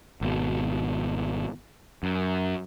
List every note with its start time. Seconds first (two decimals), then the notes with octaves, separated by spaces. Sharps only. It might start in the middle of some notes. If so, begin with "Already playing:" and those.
0.21 G#1 B2
2.03 F#2